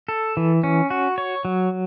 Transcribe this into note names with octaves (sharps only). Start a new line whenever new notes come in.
A4
E3
C#4
F#4
C#5
F#3